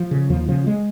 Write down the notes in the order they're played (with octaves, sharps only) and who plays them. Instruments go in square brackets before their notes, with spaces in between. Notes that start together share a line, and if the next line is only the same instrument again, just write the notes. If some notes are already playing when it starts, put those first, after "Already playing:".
Already playing: [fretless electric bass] F3
C#3
D#2 F3
C#3 F3
G#3